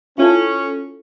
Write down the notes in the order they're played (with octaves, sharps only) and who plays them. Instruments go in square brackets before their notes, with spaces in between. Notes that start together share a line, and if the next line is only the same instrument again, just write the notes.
[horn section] C#4 [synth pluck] E4 F4 A4